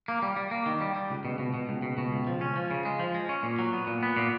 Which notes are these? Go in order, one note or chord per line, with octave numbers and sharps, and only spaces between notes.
A#3
G3
G3
A#3
D#3
G3
G3
C#2
B2
B2
B2
C#2
B2
B2
C#2
F3
C#4
F3
C#3
G#3
F3
G#3
C#4
A#2
F#3
B3
A#2
B3
A#2